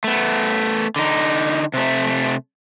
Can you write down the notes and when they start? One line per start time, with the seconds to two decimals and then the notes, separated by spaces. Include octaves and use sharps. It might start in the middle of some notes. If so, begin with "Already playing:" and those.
0.04 A3 B3
0.96 D3 D#4
1.74 C3 A3